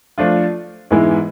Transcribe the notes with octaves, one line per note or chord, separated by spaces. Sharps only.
F3 A3 D4 F4
G#2 E3 G#3 B3 E4